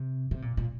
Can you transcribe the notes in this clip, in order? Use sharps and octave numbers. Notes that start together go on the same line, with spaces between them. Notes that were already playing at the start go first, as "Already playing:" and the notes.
Already playing: C3
C3
A#2
A#2